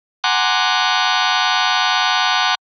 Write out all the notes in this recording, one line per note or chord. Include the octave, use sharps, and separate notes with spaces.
F#5 G#5 A#5 C6 D6 F#6